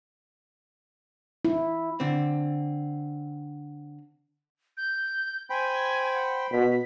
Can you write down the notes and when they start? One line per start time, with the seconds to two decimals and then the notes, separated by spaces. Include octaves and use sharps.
1.45 E4
2.00 D3 C4
4.77 G6
5.50 C5 G5 G#5 B5
6.14 F#5
6.53 B2 B6